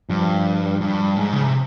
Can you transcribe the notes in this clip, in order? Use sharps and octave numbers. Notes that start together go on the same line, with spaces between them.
G2 F3
G2
G#2
C#3
C3